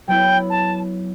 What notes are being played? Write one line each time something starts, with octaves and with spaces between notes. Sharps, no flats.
F#3 B3 E4 G5
A5